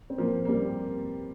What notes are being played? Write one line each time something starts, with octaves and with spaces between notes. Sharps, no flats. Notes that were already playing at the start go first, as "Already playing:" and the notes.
C4
F3 A#3
A#3
G3 C4